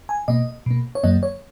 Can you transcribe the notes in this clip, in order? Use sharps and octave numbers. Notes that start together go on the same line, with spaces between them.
G#5
B2 A#3 D#5
B2 A#3
C#5
F#2 D#3 F#3 A#3 D#5
C#5